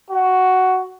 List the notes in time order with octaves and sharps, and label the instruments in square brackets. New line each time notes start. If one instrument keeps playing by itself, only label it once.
[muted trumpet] F#4